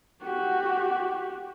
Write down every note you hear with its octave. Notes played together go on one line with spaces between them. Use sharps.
F#4 G4